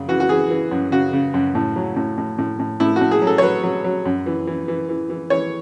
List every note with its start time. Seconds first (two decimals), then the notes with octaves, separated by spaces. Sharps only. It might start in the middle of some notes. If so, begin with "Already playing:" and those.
Already playing: F#2 C#3
0.08 E3 F#4
0.20 F#4
0.29 E3 G#4
0.50 E3
0.71 F#2
0.92 C#3 F#4
1.13 C#3
1.34 F#2
1.55 A2
1.76 F#3
1.96 A2
2.18 A2
2.38 A2
2.59 A2
2.80 A2 E4
2.96 A2 F#4
3.11 G#4
3.22 F#3
3.27 A4
3.38 C#5
3.43 F#3 B4
3.63 F#3
3.84 F#3
4.06 F#2
4.26 E3
4.47 E3
4.68 E3
4.89 E3
5.10 E3
5.30 E3 C#5